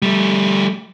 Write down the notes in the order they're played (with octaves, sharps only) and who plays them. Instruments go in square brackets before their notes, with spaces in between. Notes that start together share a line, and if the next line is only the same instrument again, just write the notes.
[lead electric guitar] G3 A3